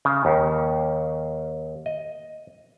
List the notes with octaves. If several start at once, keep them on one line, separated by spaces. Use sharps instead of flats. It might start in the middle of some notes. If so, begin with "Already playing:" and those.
C#3
D#2
D#5